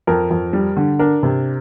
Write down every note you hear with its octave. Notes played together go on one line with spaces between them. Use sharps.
F2 A#4
F2
G3
D3
D4 A#4
C3